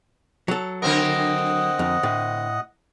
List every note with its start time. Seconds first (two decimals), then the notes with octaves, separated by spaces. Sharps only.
0.48 F#3 A4
0.82 D3 C4 A#4 D#5 F#5 D#6
1.79 F2
2.03 A2